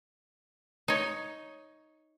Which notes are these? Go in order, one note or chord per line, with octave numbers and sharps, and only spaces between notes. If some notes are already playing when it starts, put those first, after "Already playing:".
D#4 C#5